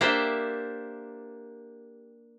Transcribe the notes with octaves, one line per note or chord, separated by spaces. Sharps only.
A#3 D4 G4 C5 E5